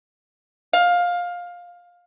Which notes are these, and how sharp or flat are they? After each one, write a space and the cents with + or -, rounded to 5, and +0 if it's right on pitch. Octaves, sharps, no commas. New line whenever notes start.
F5 +15